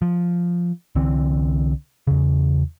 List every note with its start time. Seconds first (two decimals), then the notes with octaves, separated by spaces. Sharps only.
0.02 F3
0.95 C2 D3 E3 C4
2.07 E2 C#3